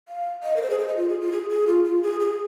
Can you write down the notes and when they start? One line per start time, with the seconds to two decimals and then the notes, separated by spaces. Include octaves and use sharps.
0.09 F5
0.43 D#5
0.56 A#4
0.62 C5
0.70 G#4
0.79 C5
0.88 D#5
0.97 F4
1.09 G#4
1.21 F4
1.32 G#4
1.49 G#4
1.67 F4
1.84 F4
2.03 G#4
2.20 G#4